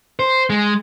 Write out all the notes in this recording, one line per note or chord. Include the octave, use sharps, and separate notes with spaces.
C5
G#3